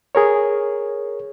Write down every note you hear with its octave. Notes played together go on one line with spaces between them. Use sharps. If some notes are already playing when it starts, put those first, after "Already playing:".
G#4 A#4 C#5